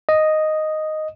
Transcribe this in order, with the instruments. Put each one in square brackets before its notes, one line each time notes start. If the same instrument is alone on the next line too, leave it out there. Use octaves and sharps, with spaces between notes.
[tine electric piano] D#5